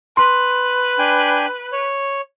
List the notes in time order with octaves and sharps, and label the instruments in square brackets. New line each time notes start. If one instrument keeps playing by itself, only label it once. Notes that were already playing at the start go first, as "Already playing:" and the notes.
[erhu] B4 [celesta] C6
[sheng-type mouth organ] D4 G5 G#5
C#5